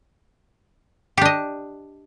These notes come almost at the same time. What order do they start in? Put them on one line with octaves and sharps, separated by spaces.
G4 D4 D#5